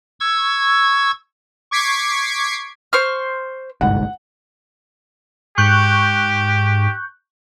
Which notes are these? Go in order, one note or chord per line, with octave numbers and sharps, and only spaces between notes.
C#6 E6 G#6
C#6 D6 G#6 B6 C7 D7
C5 C#6 F6
G1 C2 G#2 F#5
G#2 G4 C#6 F#6 G6